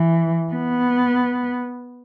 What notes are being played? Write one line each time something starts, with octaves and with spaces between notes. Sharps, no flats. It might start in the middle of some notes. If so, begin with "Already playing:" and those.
Already playing: E3
B3